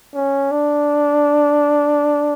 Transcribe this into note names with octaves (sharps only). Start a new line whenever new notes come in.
C#4
D4